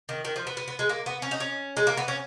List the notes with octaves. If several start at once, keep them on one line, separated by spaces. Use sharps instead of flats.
D#3
D#3
F3
B3
B3
B3
G#3
A#3
B3
C#4
D#4
C#4
G#3
A#3
B3
C#4